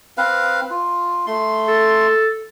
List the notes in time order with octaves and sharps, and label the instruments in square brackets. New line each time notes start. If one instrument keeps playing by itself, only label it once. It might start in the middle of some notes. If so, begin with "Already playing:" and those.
[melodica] C4 B4 F5
F4
A3 C6
[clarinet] A4